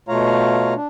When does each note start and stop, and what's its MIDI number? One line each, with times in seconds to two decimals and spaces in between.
0.09 0.74 47
0.09 0.74 57
0.09 0.74 65
0.09 0.74 73
0.09 0.74 77
0.09 0.74 82
0.76 0.88 62